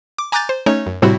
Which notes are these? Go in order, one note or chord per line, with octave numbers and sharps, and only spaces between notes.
D6
G#5 A#5 D6 F#6 G6 A6
C5
A3 C#4 D#4 C#5
F#2
A2 C3 G3 C4 E4 F#4